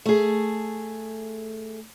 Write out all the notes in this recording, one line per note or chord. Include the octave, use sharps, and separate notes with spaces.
A3 G#4